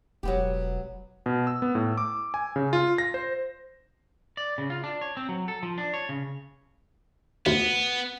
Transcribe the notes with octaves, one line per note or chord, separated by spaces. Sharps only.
E1 F#3 B3 G4
B2
E6
B3
A2
D6
G#5
C#3
F4
A#6
C5
D5
C#3
F4
D4
C#5
C4
F#3
A4
F3
D4
C#5
C#3
D2 B3